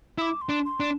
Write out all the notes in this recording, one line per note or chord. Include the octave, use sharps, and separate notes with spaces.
E4 D6 E6
C6
D4
C6
D4